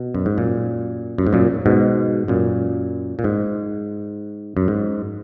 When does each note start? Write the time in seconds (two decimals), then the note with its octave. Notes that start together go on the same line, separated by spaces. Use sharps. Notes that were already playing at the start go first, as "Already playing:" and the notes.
Already playing: B2
0.15 F#2
0.26 G#2
0.38 F#2 A#2
1.18 F#2
1.27 G#2
1.33 F#2 A#2
1.66 G#2 B2
2.28 F#2 A#2
3.19 A#2
3.24 G#2
4.57 F#2
4.68 G#2